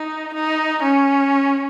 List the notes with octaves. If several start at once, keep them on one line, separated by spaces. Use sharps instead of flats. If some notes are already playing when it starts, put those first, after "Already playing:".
Already playing: D#4
D#4
C#4